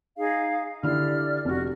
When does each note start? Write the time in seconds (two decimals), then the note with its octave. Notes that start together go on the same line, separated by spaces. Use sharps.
0.17 D#4 G#4 F5
0.83 D3 E4 G4 D5 F6
1.45 F1 F#4 G4